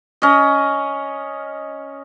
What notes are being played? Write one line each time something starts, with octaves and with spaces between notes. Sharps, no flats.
C#4 D#5